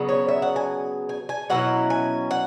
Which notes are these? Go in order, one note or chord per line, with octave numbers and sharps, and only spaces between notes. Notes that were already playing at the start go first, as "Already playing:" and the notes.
Already playing: C#3 F#3 B3
C#5
E5
F#5
G#5
G#5
G#5
B2 F#3 C#4 E4 F#5
G#5
F#5